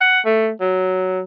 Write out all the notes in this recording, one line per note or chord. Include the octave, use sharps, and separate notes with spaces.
F#5
A3
F#3